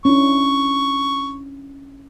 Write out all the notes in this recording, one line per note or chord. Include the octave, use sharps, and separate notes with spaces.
C#4 D4 E4 C#6